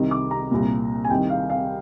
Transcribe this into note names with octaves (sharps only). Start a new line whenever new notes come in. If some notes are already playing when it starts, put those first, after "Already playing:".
Already playing: C2 C3 D#3
D6
A#5
C2 A#2
G#5
C2 C3 D#3 G5
F5
F5